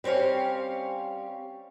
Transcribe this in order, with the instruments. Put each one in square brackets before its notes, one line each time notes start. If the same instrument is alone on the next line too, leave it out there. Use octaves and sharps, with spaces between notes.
[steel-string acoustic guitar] G3 C4 C#4 C#5 F5